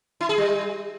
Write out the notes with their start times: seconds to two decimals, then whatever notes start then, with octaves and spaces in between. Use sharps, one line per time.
0.21 E4
0.29 G#4
0.38 G3